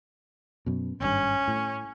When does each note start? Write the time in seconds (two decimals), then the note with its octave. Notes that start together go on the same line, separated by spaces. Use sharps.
0.66 F#2 B2
1.00 G#1 G2 C#4
1.48 A2